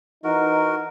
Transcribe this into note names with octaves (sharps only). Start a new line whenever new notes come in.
E3 D#4 F#4 A#4